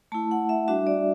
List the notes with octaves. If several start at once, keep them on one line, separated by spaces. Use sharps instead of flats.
A3 E4 A5
F#5
E5
G3 D4 F#4 E5
D5